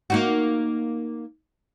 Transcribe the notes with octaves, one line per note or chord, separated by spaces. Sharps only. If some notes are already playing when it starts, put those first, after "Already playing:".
A#3 D#4 F#4